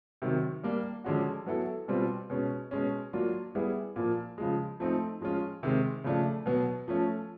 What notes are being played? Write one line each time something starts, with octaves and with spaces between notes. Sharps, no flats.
C3 D#3 F#3
G3 A#3 D4
D3 F3 G#3 C#4 F#4
F#3 B3 E4 A4
B2 G3 C4 F4
B2 G#3 C#4
B2 G#3 C#4
F#3 A#3 D4 F4
G3 B3 E4 G#4
A#2 F3 A#3
C#3 F3 G#3
F3 A3 C4 D#4
F3 G#3 C#4 F4
C3 D#3 G#3 C4
C#3 F3 A3 D4
B2 F#3 B3
F3 A3 C#4